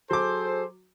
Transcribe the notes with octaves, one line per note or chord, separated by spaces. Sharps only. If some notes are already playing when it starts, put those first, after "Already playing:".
F#3 G#4 A4 C5 D6